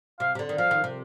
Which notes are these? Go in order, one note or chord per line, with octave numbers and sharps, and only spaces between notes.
C3 F5
C3
D3
D#3
F3 F5
D#3
C3